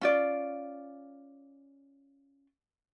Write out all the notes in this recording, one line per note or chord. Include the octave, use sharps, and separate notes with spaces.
C#4 F4 D5